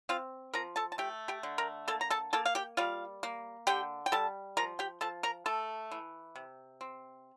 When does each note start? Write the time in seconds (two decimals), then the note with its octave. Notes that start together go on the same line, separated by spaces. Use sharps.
0.09 C4 F4 F5
0.54 F3 A#4 A#5
0.76 A4 A5
0.92 A5
0.98 A3 G4 G5
1.28 G4 G5
1.43 D3
1.58 A#4 A#5
1.88 A#3 A4 A5
2.01 A#5
2.10 A4 A5
2.33 A#3 A4 A5
2.45 F5
2.55 G4 G5
2.77 G3 F4 F5
3.23 A#3
3.67 D3 G4 G5
4.06 G5
4.12 G3 A4 A5
4.57 F3 A#4 A#5
4.79 G4 G5
5.01 F3 A4 A5
5.23 A#4 A#5
5.46 A3 A4 A5
5.91 E3
6.36 C3
6.81 C4